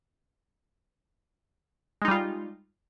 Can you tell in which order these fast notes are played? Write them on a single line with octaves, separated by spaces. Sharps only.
G#3 D#4 G3 F4